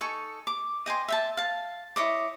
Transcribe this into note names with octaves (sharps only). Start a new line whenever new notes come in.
D#4 A4 G#5 C#6
D6
D#5 G5 G#5 C6
E5 G5 A5
F5 A5
E4 C#5 D#5 D6